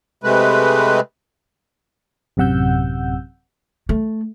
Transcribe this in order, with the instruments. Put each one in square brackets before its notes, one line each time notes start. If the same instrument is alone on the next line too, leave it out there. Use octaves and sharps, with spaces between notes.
[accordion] C3 G#3 A3 B4
[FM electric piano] A1 F#2 C3 F#5 E6 G6
[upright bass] A3